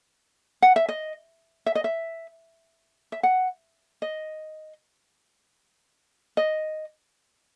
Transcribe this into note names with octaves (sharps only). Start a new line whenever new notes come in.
F#5
E5
D#5
E5
D#5
E5
E5
F#5
D#5
D#5